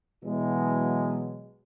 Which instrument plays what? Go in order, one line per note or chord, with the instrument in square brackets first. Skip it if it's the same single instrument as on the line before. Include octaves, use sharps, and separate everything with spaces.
[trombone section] B2 E3 F#3 G#3